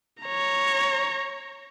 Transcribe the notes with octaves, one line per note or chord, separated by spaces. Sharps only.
C#5 A#5